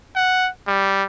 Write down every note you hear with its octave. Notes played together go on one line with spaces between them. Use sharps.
F#5
G3